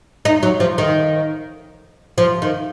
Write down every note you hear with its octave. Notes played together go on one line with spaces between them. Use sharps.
D#4
F#3
F3
D#3
F3
D#3